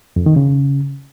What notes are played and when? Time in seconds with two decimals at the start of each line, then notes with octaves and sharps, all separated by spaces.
0.16 F2
0.26 D#3
0.36 C#3